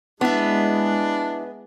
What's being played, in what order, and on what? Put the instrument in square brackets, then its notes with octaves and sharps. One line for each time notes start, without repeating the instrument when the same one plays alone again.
[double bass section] G#3 [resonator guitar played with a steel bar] B3 [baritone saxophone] D4 [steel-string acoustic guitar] E4 E5